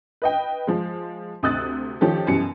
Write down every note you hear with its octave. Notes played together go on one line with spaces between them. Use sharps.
B4 D#5 G5
F3 G#3
D2 C3 D#6 E6 F#6 A6
D#3 F3 C#4 G4 A4
F#2 B2 E3 G3 C#7